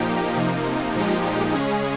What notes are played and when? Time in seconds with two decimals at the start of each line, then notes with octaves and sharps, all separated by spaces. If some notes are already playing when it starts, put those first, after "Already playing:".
Already playing: A#2 F3 A#3 D#4 G4
0.36 C3 F3 A#3 D#4
0.95 A#2 F3 G#3 D#4 G4
1.53 C#3 G#3 C#4 G#4